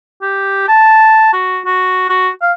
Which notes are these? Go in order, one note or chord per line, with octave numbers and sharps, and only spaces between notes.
G4
A5
F#4
F#4
F#4
F5